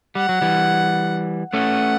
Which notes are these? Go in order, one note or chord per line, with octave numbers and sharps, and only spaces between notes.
G3 F#5
F#3
E3 G3
A3 C#4 F#5